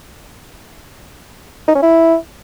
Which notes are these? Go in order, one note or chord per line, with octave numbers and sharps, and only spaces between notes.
D#4
C#4
E4